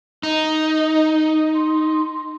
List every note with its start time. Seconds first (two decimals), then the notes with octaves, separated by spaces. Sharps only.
0.23 D#4 D#5
1.55 C6